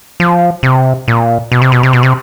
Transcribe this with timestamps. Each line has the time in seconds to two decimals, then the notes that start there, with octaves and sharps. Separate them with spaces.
0.20 F3
0.63 C3
1.08 A#2
1.52 B2
1.62 C3
1.72 B2
1.83 C3
1.93 B2
2.03 C3